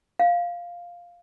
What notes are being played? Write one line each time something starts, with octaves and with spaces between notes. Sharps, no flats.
F5